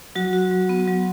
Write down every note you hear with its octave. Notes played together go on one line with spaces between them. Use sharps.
F#3 F#4
F#4
F#3
B3
F#3